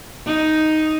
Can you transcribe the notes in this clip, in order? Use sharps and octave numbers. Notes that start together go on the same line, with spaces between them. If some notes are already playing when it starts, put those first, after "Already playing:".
D#4